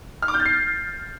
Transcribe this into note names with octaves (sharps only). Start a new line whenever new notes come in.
F6
D6
G6
A6
C7